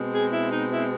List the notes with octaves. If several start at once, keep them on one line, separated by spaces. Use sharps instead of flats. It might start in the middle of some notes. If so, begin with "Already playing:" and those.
Already playing: B2 G#3 C4
G#4
E4
D#4
E4